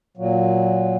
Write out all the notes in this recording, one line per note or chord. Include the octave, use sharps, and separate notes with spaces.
A#2 F#3